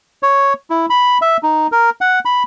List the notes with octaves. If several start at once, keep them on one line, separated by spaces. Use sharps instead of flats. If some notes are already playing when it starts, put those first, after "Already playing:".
C#5
E4
B5
E5
D#4
A#4
F#5
B5